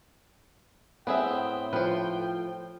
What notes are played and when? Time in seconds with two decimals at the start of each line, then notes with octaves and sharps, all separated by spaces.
1.07 A2 B3 C4 G#4 E5 G5
1.73 F3 B4 C5